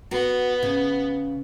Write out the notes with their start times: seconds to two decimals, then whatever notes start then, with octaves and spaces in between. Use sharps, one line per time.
0.11 B3 F#4
0.63 C#3